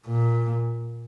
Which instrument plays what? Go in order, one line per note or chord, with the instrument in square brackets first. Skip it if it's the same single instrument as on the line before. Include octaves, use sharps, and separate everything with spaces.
[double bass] A#2